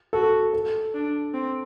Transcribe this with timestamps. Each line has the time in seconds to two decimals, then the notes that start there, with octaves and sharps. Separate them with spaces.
0.13 F#4 A4
0.54 A4
0.94 D4
1.34 C4